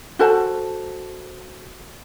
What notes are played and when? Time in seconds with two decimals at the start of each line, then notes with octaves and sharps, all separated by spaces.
0.19 F#4 A4 C5 A5